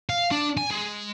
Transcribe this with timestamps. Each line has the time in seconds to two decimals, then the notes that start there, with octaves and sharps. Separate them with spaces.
0.09 F5
0.31 D4
0.57 G#5
0.70 G#3